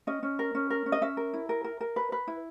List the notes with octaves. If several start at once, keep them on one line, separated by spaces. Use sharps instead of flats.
C#4 D#5
C#4
A#4
C#4
A#4
C#4
D#5
C#4 E5
A#4
E4
A#4
A#4
A#4
B4
B4
E4